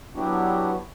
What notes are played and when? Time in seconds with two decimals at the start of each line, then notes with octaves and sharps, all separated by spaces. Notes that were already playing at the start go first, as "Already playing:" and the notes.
0.15 F#3 B3 D4 E4 F#4 G4